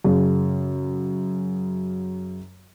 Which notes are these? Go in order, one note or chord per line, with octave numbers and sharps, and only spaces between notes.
F#2 C#3